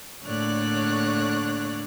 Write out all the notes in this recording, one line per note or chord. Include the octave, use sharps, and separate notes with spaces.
A2 D3 A#3 C#5 D5 F#6